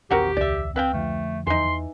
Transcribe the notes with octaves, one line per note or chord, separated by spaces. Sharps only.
A#1 E2 D#3 C4 F#4 G4 A#4
C#2 D5 E5
C4 B4 F5 G5
F2 D3 F3 A3
E2 E3 D#4 C6